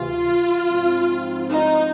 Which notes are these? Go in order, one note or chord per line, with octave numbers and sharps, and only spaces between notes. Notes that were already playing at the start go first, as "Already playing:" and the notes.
Already playing: D2 C3 E3 F4
G#2 F3 G#3 C4
D#4